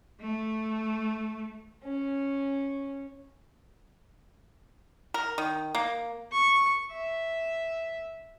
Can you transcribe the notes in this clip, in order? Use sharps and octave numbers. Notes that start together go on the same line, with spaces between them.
A3
C#4
A#4
D#3
A#3
C#6
E5